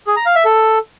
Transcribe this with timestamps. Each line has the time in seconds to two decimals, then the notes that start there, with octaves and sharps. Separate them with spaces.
0.07 G#4
0.16 A#5
0.26 F5
0.35 E5
0.45 A4